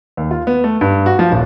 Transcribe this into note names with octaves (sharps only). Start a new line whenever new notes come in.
D#2
F4
B3
A3
G2
F#4
F3
D#1